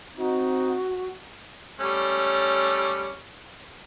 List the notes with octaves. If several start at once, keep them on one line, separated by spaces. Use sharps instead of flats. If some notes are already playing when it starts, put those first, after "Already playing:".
C4 D#4 F#4
G3 A3 C#4